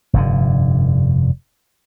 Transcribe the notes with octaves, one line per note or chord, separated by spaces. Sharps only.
F1 G2 D3